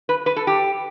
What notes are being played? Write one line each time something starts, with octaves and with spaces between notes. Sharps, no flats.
B4
B4
A4
G4